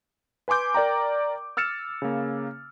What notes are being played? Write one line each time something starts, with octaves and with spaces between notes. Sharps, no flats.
B4 G#5 C6 D6 G6
A#4 D5 G5 A#5
E6 F6 A6 C#7 E7
C#3 A#3